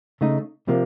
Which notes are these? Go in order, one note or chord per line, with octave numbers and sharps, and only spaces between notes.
C#3 A3 D#4
C3 F3 A#3